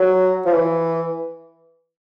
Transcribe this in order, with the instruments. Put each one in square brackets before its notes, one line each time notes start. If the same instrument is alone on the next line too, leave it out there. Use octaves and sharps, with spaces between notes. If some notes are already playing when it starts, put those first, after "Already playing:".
Already playing: [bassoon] F#3
F3
E3